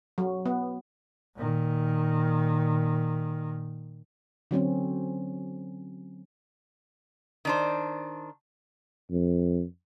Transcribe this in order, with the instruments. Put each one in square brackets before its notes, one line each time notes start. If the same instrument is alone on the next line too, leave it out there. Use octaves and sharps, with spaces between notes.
[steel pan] F#3
B3
[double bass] A#2 D#3
[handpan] D3 F#3 C4 C#4
[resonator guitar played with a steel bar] D#3 D4 C5
[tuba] F2